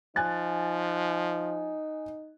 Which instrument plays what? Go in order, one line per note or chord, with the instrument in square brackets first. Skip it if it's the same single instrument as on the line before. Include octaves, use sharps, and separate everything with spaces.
[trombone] F3 [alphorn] D#4 [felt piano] G#5 F#6 A6